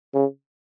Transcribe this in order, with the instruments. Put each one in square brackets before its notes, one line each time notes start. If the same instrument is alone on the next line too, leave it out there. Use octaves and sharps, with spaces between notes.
[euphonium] C#3